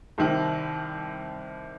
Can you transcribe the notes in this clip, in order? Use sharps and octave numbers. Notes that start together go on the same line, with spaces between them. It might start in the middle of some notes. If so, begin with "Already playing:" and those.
C2 C3 D#3